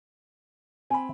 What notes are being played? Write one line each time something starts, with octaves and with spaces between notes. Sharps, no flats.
C4 G#5 B5